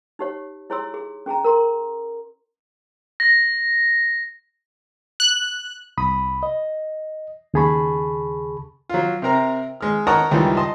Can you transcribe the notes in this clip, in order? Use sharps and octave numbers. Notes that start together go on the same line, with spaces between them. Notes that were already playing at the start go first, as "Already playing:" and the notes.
D#4 G4 C#5
E4 G#4 C#5 G#5 C6 E6
G#4
C#4 G#4 G#5 A#5
A#4 A#5 C6
A#6
F#6
C2 B5 D#6
D#5
D#2 C#3 G#4 A5 B5 C#6
F#3 F4
C3 C4 A#4 A#5
G#3 F6
A#4 C#5 D#5 F#5 A5 A#5
C#2 D#3 E3 G3
D#5 A5 C6